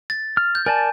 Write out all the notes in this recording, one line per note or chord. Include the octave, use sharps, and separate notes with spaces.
A6
F6
G6
A#4 D5 G#5 A5